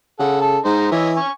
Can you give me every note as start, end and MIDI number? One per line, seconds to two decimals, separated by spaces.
0.19 0.58 49
0.19 0.38 69
0.19 0.38 78
0.42 0.58 69
0.42 0.58 81
0.65 0.90 44
0.65 0.89 63
0.65 0.89 72
0.65 0.89 82
0.92 1.19 52
0.92 1.10 64
0.92 1.10 73
0.92 1.10 75
1.17 1.30 80
1.17 1.30 85